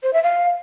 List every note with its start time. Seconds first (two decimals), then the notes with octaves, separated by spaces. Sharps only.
0.03 C5
0.13 E5
0.23 F5